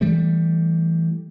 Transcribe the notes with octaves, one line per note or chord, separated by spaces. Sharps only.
E3 G3 A3